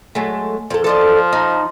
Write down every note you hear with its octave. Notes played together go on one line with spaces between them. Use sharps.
F#3 G#3 A3
F2 A4
F3 A4 D5 D#5
D#4